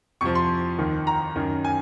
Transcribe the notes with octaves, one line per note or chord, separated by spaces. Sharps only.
F2 C3 F3 C#6
C6
D#2 D#3
A#5
F#2 D#3
G#5